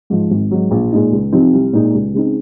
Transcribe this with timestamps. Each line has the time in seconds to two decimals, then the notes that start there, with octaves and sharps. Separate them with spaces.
0.10 G#2 F3
0.31 G#1
0.51 G#2 F#3
0.71 A#1
0.92 A#2 G#3 D#4
1.12 C#2
1.33 C3 F3 C4 D#4
1.53 C2
1.73 A#2 G#3 D#4
1.94 C#2
2.14 C#3 G#3 C4 D#4